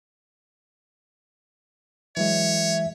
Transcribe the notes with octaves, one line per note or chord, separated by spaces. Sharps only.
E3 F#3 G#3 C#5 E5